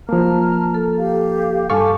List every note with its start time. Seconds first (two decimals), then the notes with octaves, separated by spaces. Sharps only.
0.09 F3 A#3 A5 A#5 F6
0.74 A4
0.98 G4 F5
1.70 G2 A4 F5 G#5 A5 C#6 D6